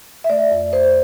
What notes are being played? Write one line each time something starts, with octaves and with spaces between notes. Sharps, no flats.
E5
A3 D5
F2
F2 C5